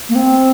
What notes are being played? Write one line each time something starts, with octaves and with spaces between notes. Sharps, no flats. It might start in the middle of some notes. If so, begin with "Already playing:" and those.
A#3
C4